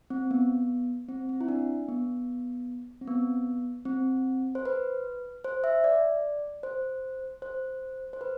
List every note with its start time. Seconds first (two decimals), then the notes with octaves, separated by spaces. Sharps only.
0.10 C4
0.31 B3
1.09 C4
1.29 C4
1.41 E4
1.48 D4
1.89 B3
3.01 C4
3.07 B3
3.85 C4
4.55 C5
4.65 B4
5.44 C5
5.64 E5
5.84 D5
6.63 C5
7.42 C5
8.13 C5
8.21 B4